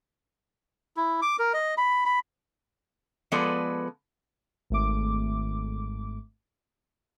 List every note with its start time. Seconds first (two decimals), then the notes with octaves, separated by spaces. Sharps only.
0.97 E4
1.22 D6
1.39 A#4
1.54 D#5
1.78 B5
2.05 B5
3.32 F3 G#3 B3 A4 B4 D5
4.70 G#1 A3 D6